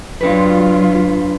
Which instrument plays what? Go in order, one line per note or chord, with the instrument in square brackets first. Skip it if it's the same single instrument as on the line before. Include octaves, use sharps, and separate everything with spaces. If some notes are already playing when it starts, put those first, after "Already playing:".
[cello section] F#3 F4 [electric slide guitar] D4 B4